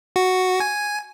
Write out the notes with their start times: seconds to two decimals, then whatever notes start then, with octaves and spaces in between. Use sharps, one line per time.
0.16 F#4
0.60 G#5